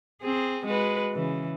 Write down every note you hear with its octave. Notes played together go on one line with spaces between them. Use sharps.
C4 G#4
G#3 F#4 B4
C#3 E3